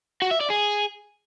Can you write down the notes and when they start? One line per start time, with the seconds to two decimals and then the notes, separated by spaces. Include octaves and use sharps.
0.22 F#4
0.31 E5
0.40 D5
0.50 G#4